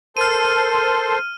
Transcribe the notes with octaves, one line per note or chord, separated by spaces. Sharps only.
A4 A#4 C5 C6 F6 D#7